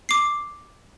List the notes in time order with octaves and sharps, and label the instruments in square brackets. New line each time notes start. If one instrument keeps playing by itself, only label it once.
[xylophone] D6 C7